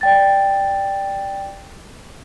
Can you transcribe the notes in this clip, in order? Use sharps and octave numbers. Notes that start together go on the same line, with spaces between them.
D5 G5 A6